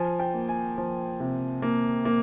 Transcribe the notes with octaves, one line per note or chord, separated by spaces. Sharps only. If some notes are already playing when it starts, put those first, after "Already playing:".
Already playing: F3 G#5
G5
A#3
G#5
F3
C3
A#3
A#3